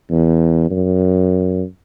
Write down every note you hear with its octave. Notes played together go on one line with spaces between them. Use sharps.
E2
F#2